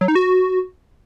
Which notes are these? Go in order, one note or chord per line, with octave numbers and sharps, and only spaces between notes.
F#3
D#4
F#4